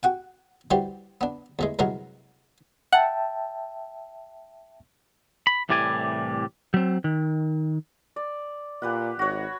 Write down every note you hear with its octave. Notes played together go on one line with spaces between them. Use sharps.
F#4 F#5 G5
E3 G3 F#4 G4 C5
B3 D4
E2 E3 G#3
C2 F#2 E3 G#3 F#4 A#4
E5 F#5 G5 A5
B5
C2 A2 E3 G4 D5 G#5
F#3 C4
D#3
D5
A#2 G4 B4 F#5
G#1 F#4 C#5